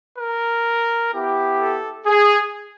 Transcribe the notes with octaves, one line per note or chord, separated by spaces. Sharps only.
A#4
B3 E4 G4
A4
G#4